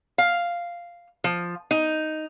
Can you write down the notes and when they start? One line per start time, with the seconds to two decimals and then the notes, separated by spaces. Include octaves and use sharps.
0.18 F5
1.24 F3
1.71 D#4